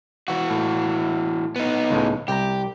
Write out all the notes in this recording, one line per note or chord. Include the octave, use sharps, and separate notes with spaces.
E3 F#4
A2
B3 D#4
C#2 A2 G#3
C2 G4 G5 A#5